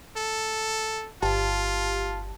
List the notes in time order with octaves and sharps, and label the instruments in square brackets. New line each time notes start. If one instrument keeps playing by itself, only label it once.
[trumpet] A4
[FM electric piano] G1 G4 A5 [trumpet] F4